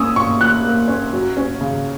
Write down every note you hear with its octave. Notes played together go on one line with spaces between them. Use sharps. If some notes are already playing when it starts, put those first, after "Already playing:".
Already playing: A#3 C#4 D#6 E6
A#2 C#6
A#2 F#6
A#3
C#4
F#3
C#4
C#3